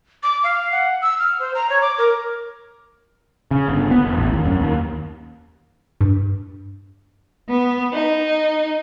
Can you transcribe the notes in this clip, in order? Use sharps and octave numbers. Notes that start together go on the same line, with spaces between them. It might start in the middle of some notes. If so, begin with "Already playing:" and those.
D6
F5
F#5
E6
F6
C5
A#5
C#5
D6
A#4
C#3
G1
B3
E1
A1
D#2
F#2
D#2
G2
B3
D#4